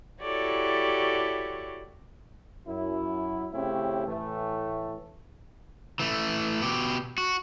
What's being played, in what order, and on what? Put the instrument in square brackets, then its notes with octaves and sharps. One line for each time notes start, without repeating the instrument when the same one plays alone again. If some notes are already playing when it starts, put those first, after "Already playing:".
[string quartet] E4 F#4 G4 A4 C#5 D5
[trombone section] F#2 E4
C#3 A3 C4 C#4 E4 G4
A2 E3 A3
[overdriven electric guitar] E3 A3
B2 G4
F#4